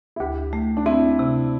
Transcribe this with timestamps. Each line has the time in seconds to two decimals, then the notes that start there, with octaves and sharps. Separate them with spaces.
0.16 E4
0.20 D2 G4
0.53 A3
0.77 D4
0.86 C4 E4
1.19 C3